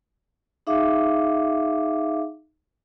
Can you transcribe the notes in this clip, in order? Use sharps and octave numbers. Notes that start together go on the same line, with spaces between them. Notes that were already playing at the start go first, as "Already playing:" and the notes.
D#4 G#4 E5 F5 D6